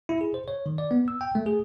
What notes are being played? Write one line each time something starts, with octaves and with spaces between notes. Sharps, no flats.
E4
G#4
C5
C#5
D#3
D5
B3
E6
G5
A3
G#4